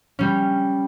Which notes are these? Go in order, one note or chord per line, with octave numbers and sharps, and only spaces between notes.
G3 C#4